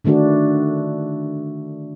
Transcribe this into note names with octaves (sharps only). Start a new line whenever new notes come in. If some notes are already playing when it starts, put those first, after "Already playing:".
D3 D#3 A3 D4 F#4